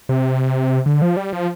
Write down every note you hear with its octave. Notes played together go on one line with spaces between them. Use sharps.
C3
D3
F3
G3
F3